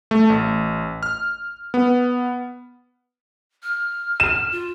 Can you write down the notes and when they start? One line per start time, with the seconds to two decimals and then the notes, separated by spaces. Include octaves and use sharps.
0.11 A3
0.30 A1
1.03 F6
1.74 B3
3.63 F6
4.20 E7
4.52 F4